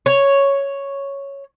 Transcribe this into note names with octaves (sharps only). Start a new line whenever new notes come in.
C#5